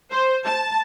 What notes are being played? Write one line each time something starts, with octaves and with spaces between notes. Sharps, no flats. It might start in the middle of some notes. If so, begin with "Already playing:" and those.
C5
A5